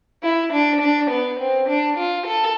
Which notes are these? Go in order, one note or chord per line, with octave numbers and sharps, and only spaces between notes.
E4
D4
D4
B3
C4
D4
F4
A4